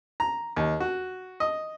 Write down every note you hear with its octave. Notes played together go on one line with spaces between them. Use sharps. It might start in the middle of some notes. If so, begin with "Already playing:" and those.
A#5
D#2
F#4
D#5